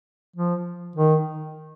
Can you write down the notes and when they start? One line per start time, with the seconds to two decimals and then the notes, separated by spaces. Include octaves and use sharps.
0.36 F3
0.96 D#3